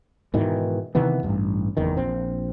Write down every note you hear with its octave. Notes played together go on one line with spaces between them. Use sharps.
G#2 B2 D#3 E3
C3 D#3 E3 B3
A1 G2
F#1 E2 D#3
A#1 C4